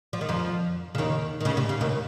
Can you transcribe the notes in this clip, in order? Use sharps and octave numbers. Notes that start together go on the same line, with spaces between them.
F3
D#3
F2 F3
C#3
D#2 D#3
D#3
C#3
C3
C#3
D#2 D#3